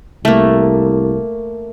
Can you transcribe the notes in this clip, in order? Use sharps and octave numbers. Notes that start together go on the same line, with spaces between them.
C2 A3 A#3